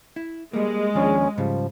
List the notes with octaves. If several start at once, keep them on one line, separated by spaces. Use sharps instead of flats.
E4
G3 G#3 A#3
D#2 F3 C#4 D4
G#2 C#3 F3 G3